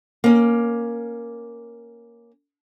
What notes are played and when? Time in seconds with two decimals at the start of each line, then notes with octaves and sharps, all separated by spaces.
0.24 A#3 C#4